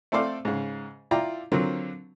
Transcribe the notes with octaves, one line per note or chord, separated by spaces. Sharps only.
A3 C4 A4 C5 D5 F5
G#2 C#3
E4 F4 D5 G5 A#5
D3 F#3 C4 F4 A#4